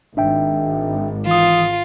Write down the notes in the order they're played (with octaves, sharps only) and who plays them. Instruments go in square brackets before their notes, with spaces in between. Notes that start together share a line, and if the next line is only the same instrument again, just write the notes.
[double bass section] G#1 [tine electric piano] D4 E5 G5
[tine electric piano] E3 D#6 [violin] F4